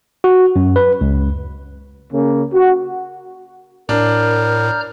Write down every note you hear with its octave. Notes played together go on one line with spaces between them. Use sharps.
F#4
F#2
B4
C#2
C#3 A#3 C#4
F#4
A2 D4 A#4 A#5 F6 G6